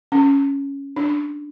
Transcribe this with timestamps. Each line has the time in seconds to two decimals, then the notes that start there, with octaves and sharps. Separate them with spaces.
0.12 C#4
0.96 D4